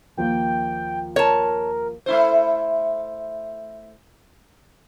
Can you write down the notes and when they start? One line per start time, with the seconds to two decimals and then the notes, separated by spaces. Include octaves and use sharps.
0.17 D#2 F3 A#3 G5
1.16 A#4 C#5 A5
2.06 A3 E4 C5